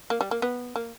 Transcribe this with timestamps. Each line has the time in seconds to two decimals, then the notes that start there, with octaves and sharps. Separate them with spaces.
0.10 A#3
0.21 G3
0.31 A#3
0.42 B3
0.76 A#3